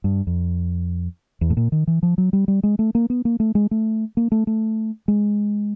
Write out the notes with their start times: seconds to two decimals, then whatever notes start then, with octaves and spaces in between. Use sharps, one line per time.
0.04 G2
0.27 F2
1.41 E2
1.50 A2
1.57 A#2
1.72 D#3
1.87 E3
2.03 F3
2.18 F#3
2.33 G3
2.48 G3
2.63 G#3
2.79 A3
2.95 A#3
3.10 B3
3.25 A#3
3.40 A3
3.55 G#3
3.71 A3
4.17 A#3
4.32 A3
4.47 A3
5.08 G#3